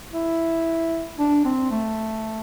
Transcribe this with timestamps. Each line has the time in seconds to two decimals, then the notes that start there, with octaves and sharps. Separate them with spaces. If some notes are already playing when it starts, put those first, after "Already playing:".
0.13 E4
1.19 D4
1.45 C4
1.71 A3